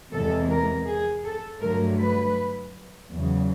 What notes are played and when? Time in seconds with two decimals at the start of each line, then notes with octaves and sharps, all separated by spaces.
0.12 E2 C3 E3 G#3 A4
0.50 A#4
0.87 G#4
1.24 A4
1.61 G2 D3 F#3 A3 A#4
1.99 B4
3.11 E2 C#3 F#3